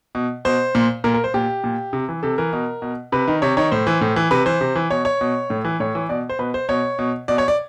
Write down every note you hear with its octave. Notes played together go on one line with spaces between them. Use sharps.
B2
B2 C5
A#2
A#2 A#4
A#4
C5
A#2 G4
A#2
C3
E3
C3 A4
E3 A#4
B2
B2
C3 B4
D#3
C3 C#5
D#3 C#5
A2 C5
E3
A2
E3
C3 B4
E3 C5
C3
E3
B2 C#5
C#5
B2
A2
E3
A2 C#5
E3
B2 D5
C5
B2 B4
C5
B2 C#5
B2
B2 D5
C#5
D5